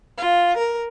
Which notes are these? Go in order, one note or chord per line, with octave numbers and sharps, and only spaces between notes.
F4
A#4